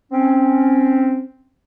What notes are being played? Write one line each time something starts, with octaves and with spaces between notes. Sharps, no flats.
C4 C#4